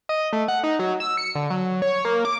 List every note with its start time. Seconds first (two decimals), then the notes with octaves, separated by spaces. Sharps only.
0.09 D#5
0.33 A3
0.48 F#5
0.64 D#4
0.79 F#3
1.00 E6
1.17 C#7
1.35 D3
1.50 F#3
1.82 C#5
2.05 A#3
2.25 D6